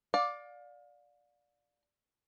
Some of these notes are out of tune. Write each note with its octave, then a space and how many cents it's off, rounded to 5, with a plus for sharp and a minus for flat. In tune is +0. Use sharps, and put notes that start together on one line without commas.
D5 +0 F5 +30